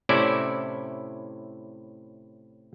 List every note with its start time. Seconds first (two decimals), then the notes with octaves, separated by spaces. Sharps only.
0.09 A2 C3 C#4 E4 D5 E5